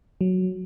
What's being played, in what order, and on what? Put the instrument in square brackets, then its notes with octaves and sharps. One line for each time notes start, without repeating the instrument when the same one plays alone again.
[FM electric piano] F#3